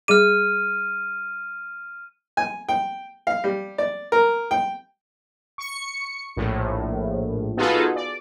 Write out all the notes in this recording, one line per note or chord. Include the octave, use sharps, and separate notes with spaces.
G3 G#4 D6 F6 D#7
G#5
G5
F5
G3
D5
A#4
G5
C#6 C#7
A#1 A2
B3 D#4 F4 F#4 G#4 A4
D5